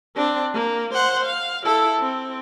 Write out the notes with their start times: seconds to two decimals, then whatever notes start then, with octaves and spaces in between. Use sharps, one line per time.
0.16 C4 D4
0.54 A#3
0.94 C5 F#5
1.26 F5
1.65 E4 A4
1.99 C4